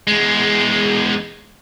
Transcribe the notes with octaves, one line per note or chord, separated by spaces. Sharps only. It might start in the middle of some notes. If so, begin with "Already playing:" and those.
E2 G#3